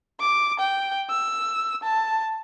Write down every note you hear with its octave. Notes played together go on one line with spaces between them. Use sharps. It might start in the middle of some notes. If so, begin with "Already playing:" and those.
D6
G5
E6
A5